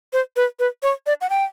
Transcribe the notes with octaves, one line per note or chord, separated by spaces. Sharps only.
C5
B4
B4
C#5
D5
F#5
G5